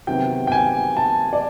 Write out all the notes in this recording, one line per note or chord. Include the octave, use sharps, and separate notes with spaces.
C3 D#3 F#3 B3 G5
G5
G#5
A5
D5